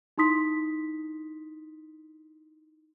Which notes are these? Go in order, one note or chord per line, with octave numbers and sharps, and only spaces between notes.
D#4 E4 C6 D#6 B6